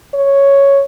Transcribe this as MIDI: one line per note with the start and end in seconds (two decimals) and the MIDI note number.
0.14 0.83 73